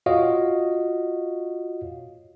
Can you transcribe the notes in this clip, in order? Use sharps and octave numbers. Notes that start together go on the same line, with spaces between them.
F4 F#4 C#5 D#5 F5